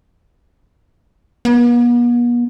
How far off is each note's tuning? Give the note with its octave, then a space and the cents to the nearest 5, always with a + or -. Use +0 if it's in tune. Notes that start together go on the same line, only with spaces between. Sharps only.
B3 -45